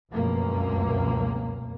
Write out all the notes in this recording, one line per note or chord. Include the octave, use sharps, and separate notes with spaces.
F1 C#2 F#2 B2 F3 A#3